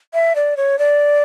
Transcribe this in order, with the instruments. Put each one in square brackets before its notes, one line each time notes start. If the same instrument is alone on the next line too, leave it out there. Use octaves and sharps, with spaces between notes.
[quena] E5
D5
C#5
D5